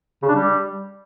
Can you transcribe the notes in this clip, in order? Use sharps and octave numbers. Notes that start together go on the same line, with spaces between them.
C#3
D4
G3